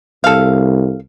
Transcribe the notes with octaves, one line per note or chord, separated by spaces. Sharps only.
C2 A4 F5